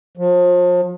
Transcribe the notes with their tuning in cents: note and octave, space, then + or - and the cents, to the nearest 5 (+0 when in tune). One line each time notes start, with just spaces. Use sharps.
F3 +35